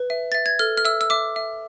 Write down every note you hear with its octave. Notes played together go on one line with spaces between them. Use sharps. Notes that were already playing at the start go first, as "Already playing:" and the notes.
Already playing: B4
E5
E5 A6
G#6
A4 F6
F6
E5 E6
E6
E5 D6
E5